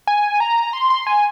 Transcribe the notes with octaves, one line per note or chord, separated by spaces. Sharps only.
G#5
A#5
C6
C6
G#5